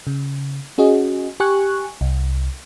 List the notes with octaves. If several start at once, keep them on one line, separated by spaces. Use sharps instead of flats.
C#3
C#4 F#4 G#4 D#5
G4 G#5 C#6 F#6
C2